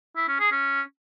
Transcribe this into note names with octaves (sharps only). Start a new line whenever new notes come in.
E4
C#4
G#4
C#4